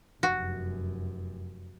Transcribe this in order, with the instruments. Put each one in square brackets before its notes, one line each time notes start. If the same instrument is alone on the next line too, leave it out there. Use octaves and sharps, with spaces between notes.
[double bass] F1 F#2 [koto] F#4